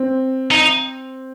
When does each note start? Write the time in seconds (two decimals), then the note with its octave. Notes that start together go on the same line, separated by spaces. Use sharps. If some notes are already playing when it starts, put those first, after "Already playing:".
Already playing: C4
0.51 D#4